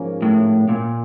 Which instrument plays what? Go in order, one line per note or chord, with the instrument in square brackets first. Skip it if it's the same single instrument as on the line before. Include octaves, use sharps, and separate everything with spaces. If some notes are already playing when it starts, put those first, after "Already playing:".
Already playing: [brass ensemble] G#2 F3 A#3 C#4
[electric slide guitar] A2
A#2